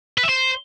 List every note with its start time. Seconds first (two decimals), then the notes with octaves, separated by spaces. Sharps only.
0.18 B4
0.23 E5
0.29 C5